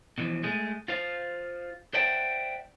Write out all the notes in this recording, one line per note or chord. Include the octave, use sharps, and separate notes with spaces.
B2 D3 E3 F3
G#3 A3 G#4
F4 C5 F5
C5 D5 E5 F#5 G5 A5